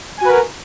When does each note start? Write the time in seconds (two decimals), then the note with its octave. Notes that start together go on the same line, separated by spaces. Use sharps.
0.17 G#5
0.21 F#4
0.25 B4
0.28 A#4